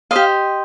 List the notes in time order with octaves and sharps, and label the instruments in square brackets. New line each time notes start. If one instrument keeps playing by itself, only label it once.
[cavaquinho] G4 C5 D#5 F5